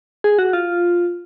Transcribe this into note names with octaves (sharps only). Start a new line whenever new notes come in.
G#4
F#4
F4